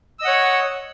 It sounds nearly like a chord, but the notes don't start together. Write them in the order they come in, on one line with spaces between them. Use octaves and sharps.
E6 D#5 F#5 C#5